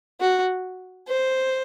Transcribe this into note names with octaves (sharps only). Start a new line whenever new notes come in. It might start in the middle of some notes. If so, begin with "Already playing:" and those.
F#4
C5